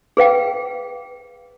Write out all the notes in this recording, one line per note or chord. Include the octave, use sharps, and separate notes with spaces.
G#4 B4 F5 G5